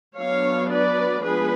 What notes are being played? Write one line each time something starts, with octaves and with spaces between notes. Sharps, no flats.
F#3 B3 D4 C#5 F5
B4 D5
F3 G#3 B3 D4 G#4 B4